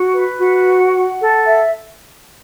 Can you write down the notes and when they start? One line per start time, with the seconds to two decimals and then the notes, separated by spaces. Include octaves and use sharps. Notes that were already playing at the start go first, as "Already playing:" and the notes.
Already playing: F#4
0.13 B4
0.40 F#4
0.67 F#5
0.93 F#5
1.20 A4
1.46 E5